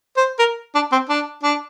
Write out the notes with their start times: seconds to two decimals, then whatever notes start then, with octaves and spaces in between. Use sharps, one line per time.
0.17 C5
0.39 A#4
0.75 D4
0.92 C4
1.09 D4
1.43 D4